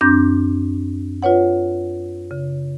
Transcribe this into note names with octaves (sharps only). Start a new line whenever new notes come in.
F#2 C4 D4 D6 G6 A#6
F4 B4 C#5 F#5
C#3